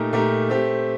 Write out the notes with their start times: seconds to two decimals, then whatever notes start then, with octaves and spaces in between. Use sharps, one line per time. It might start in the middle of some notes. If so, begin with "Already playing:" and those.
Already playing: A#2 A3 D#4 G4 A#4
0.12 A#2 A3 D#4 G4 A#4
0.50 A3 C4 G4